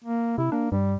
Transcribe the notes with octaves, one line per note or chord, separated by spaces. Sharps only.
A#3
C3 E4
A#3 D4
G2 G3